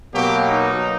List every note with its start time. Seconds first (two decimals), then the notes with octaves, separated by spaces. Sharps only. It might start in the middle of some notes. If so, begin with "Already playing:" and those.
0.14 B2 F#3 A#3 G4
0.48 D#4